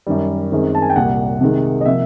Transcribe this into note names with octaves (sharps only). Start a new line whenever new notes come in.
F#2 D#3 G3
F#2 D#3 G#3 C4
A5
G#5
G5
C2 A#2 G3 F#5
C3 D#3 G#3
D#5
C3 F3 A#3 E5